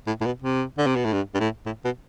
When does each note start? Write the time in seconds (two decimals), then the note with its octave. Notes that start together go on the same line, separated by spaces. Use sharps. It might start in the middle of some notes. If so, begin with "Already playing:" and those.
0.07 A2
0.21 A2
0.25 B2
0.42 C3
0.78 D3
0.86 C3
0.96 B2
1.05 A2
1.13 G2
1.34 G2
1.40 A2
1.66 A2
1.85 B2